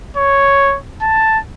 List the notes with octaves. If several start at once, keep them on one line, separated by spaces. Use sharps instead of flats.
C#5
A5